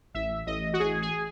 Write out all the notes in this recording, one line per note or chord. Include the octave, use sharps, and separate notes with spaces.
A1 E5
A1 D#5
F#4
A1 G#4
G#4